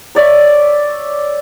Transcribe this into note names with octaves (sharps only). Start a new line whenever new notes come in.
C#5 D5 E5